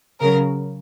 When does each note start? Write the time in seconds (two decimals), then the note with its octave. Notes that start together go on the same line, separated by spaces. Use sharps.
0.21 C#3 F#3 A#4